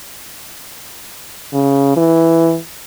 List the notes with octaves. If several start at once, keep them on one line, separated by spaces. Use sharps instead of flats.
C#3
E3